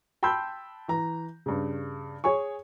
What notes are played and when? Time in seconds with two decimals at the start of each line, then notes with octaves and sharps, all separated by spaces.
0.23 G5 A5 B5 C6 E6 G6
0.88 E3 A#5
1.46 G2 C#3
2.24 G#4 C#5 G#5 C#6